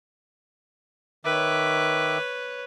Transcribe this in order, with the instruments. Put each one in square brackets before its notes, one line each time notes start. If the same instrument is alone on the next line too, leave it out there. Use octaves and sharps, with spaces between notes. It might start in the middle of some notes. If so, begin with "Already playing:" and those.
[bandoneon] D#3 E5 D6 [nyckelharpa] B4 C#5